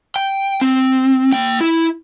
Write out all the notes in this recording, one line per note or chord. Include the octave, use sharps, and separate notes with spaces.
G5
C4
A#3 G5
E4